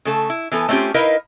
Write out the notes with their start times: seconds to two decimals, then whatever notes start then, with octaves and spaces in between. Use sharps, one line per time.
0.05 C#3 A3 A4
0.30 E4
0.51 E3 B3 A4 G#5
0.69 A3 C4 C#4 F4 G4
0.94 D#4 E4 A#4 B4 D#5 F5